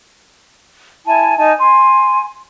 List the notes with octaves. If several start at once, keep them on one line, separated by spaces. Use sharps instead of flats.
E4 G#5 A5
D#4 G#5 A5
G#5 C6